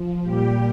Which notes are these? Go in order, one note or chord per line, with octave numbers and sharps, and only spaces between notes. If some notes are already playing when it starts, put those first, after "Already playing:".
Already playing: F3
A#2 G3 G4